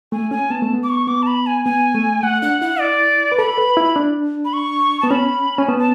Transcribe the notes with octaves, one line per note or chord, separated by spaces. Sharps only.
A3 G#5
C#4 G#5
B3 A5
A3
B3
D6
C#6
B3 D6
A5
B5
G#5
B3 G#5
A3
A3 F#5
D4 F#5
E4 F#5
D5
B4
A4 B5
B4
E4
D4
B5
C#6
B3 A5
C#4 B5
C#4 G#5
B3 A5
A5